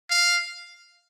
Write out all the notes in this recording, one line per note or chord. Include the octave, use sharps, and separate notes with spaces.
F5